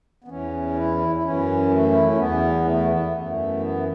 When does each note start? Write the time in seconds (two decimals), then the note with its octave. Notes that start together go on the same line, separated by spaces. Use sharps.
0.24 B3
0.28 E2 E3 C#4
0.76 E4
1.16 E4
1.23 F#2 E3 C#4
1.71 A3
1.92 E4
2.05 C#4
2.17 E2 E3 B3
2.65 A3
2.88 B3
3.12 F#2 E3 A3
3.59 B3